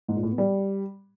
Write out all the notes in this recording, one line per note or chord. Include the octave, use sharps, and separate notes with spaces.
G#2
A#2
A2
B3
G3